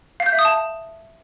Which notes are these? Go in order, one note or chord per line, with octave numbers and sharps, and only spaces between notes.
F5
G6
E5
D#6
A5